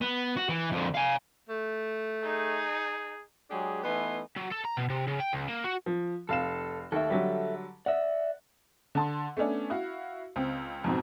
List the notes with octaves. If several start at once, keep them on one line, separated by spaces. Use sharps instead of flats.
B3
F#4
E3
F2 D3
F5 G#5
A3
D#4 G#4
F#3 G#3 D4 G4 G#4
E3 A3 B3 D#4 G#5 C6
F#3
A4
A#5
B2
C3
C#3
G5
C#2
A#3
F#4
F3
F1 A4 F5 E7
D#2 A4 E5
D3 F#3 G3
D5 E5 F#5
D3 A5 C6
A3 B3 C#4 D4
E4 F#4 F5
C#2 C4
F2 G#2 B2 C4